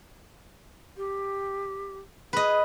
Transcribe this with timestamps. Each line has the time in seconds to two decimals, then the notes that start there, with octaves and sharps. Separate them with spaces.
0.97 G4
2.33 G#4 B4 D#5